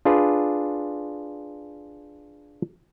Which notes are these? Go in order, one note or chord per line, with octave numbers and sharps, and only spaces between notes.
D4 F4 G#4 B4 D5